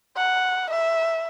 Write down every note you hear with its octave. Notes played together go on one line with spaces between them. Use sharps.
F#5
E5